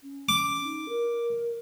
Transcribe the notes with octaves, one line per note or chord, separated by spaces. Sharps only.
C#4
D6
D#4
A#4